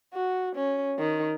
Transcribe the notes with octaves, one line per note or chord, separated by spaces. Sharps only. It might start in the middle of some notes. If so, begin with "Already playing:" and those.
F#4
C#4
D#3